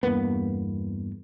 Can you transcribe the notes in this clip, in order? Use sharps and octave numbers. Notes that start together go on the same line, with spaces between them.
E2 G2 A#3 B3